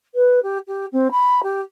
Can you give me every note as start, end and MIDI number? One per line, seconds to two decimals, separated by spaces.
0.15 0.40 71
0.43 0.58 67
0.68 0.86 67
0.92 1.11 60
1.11 1.41 83
1.43 1.61 67